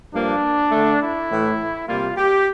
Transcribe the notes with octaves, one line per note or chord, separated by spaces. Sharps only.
G2 F3 A#3 D4
D3 A3
E4
A2 E3 A3
C3 G3 A#3 F4
G4